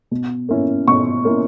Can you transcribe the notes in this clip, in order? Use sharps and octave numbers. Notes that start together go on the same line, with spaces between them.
B2
A#3 C#4 E4
B2 C#6
A#3 C#4 E4